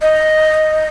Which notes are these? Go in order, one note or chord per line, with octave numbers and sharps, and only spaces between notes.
D#5